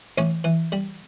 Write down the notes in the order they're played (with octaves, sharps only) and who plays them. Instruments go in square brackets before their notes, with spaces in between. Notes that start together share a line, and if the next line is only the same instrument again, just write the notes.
[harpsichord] A1 C#4 C#5
E3
G3